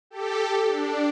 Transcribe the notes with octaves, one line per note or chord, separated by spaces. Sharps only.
G4 A4
D4